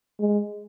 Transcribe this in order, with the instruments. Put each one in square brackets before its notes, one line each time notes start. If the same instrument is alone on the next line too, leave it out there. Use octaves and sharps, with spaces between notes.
[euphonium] G#3